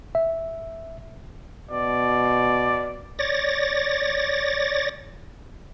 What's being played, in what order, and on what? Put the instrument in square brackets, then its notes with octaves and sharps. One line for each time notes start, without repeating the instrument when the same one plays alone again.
[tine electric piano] E5
[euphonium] B2 [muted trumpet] D5
[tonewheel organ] C#5 D5 A6 A#6